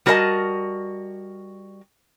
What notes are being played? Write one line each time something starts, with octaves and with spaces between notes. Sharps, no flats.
G3 F#4 A#4 B4 D#5 A5